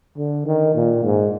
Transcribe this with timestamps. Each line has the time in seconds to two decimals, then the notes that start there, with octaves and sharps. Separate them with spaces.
0.17 D3
0.46 D#3
0.75 A#2
1.04 G#2